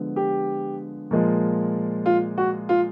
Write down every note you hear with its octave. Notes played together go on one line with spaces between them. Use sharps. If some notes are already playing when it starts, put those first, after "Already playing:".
Already playing: D3 F3 G#3 B3
G4
A#2 F3 G#3
F4
F#4
F4